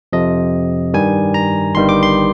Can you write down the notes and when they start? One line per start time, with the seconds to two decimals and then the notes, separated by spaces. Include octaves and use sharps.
0.13 F2 C3 F3 D#5
0.94 G2 D#3 G3 G#5
1.34 A#5
1.75 G1 G2 D#3 G3 C6
1.89 D6
2.03 C6